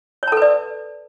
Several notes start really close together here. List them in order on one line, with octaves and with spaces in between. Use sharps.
C#5 A5 A4 B4 D5